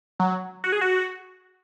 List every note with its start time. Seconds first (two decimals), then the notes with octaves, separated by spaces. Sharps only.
0.20 F#3
0.64 F#4
0.72 G#4
0.81 F#4